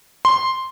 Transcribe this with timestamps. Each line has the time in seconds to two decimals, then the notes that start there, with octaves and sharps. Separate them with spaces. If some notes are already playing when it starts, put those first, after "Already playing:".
0.25 C6